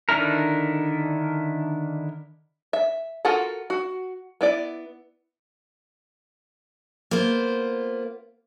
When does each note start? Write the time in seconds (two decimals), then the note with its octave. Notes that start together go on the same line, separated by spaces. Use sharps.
0.09 D3 D#3 D4 E4 A#4
2.73 E5
3.25 F4 F#4 A4 A#4 F#5
3.70 F#4
4.41 B3 E4 D5
7.11 A#3 B3 F4 C5